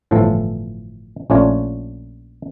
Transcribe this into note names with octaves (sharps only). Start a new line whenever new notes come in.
G1 A2 E3 F3 A4
A#1 A3 C#4 D4 F4 C#5